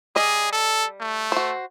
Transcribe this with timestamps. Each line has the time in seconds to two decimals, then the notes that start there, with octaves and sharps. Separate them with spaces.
0.16 G3 G#4 D#5
0.53 A4
1.01 A3
1.32 F#4 C5